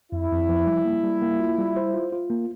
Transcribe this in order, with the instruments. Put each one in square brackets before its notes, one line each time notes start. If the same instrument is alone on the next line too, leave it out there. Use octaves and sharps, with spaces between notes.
[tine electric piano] F2 [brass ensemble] E4
[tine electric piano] F2
F3
G3
A#3
G3
A#3
F4
G3
C5
F4
F4
A#3